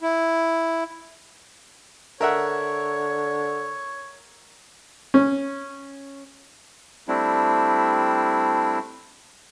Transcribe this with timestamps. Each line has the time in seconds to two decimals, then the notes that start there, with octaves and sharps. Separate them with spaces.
0.01 E4
2.21 D3 A#4 C#5 E5 F#5
5.14 C#4
7.08 G3 A3 C4 D4 E4